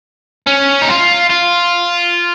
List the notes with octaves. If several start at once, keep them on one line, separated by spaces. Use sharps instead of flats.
C#4
D#4
F4
F4